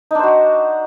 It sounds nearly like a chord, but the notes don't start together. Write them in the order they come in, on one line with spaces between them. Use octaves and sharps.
D#4 D4 C5 F#4